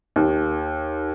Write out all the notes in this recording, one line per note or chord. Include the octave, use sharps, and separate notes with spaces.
D#2